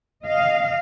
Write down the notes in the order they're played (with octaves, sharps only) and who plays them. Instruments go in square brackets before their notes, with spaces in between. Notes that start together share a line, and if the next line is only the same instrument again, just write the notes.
[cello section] D#5 F5